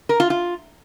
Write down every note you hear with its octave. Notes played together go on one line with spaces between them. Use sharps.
A#4
F4
F4